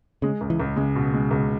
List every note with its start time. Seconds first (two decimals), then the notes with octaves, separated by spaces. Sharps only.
0.22 C#3 G#3
0.41 C#2
0.50 E3
0.60 C#2
0.76 C#3 G#3
0.95 B2
1.13 G#3
1.31 C#2